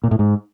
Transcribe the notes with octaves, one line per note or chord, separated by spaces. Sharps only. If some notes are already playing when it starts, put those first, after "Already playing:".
A#2
A2
G#2